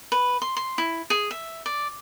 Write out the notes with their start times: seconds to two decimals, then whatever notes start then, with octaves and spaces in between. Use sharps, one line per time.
0.12 B4
0.42 C6
0.57 C6
0.78 E4
1.10 G#4
1.31 E5
1.66 D5